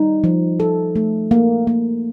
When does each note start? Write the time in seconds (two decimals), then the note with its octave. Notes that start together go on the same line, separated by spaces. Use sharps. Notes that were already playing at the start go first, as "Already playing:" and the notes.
Already playing: G3 D#4
0.24 F3
0.60 A4
0.96 A3
1.31 A#3
1.67 A#3